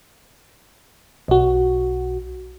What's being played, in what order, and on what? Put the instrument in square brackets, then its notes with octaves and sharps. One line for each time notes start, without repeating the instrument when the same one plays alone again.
[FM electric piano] B1 F#4